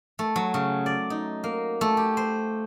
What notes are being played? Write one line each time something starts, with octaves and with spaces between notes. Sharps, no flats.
A3
F#3
C#3
D5
D#4
A#3
A3
G4
C5